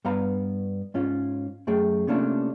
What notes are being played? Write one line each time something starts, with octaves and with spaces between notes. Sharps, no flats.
G2 B3 F5 A#5 B5
G#2 C#4 F4
F#2 A3 G#4 G5
C3 A3 A#3 C#4 D4 F4